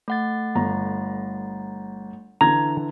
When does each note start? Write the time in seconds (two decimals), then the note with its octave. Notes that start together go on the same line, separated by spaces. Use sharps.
0.08 A3 F#5 A6
0.55 G1 A#5
2.41 D3 E3 A#5 G#6